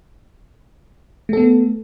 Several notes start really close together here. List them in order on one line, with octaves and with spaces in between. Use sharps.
A3 A4 B3